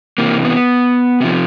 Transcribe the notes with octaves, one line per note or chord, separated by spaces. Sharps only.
C3 E3 A#3
B3
C3 F3